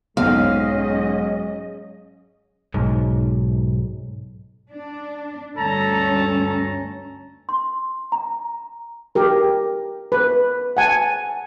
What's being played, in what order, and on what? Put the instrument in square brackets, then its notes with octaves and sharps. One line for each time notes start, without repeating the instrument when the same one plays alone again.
[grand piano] B1 G#2 [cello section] F#3 C#4 D#5 [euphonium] G#3 [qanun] F5
[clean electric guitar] B1 G#2
[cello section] D4
[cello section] D2 G2 C#4 [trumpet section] A4 A5 A#5
[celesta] C6
A#5
[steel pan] G4 A#4
B4
F#5 G#5 A5